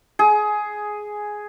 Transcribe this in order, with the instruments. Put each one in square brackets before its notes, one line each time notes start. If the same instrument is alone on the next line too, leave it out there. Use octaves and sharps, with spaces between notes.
[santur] G#4